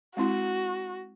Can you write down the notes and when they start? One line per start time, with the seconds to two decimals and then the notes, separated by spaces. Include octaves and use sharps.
0.17 G#3 C4 E4 F#4